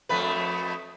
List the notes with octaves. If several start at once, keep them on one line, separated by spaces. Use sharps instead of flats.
F2 A3 B4